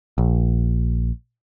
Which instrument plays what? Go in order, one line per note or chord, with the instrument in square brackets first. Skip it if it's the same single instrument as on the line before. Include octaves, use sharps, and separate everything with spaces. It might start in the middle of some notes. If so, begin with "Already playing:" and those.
[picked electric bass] A#1